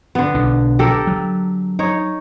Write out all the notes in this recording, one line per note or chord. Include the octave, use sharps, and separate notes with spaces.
D3 B3
B1 D4
G4 A4 A#4
F#3
D#4 C#5